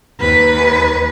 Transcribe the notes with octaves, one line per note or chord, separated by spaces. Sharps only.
D#2 B4